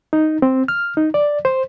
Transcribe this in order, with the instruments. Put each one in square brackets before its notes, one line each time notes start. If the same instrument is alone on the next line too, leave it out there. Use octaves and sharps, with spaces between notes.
[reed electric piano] D#4
C4
F6
D#4
D5
C5